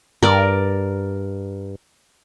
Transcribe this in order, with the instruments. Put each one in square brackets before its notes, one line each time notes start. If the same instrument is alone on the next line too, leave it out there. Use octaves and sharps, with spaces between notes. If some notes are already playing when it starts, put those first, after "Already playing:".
[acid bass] G2 [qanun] A#4 D5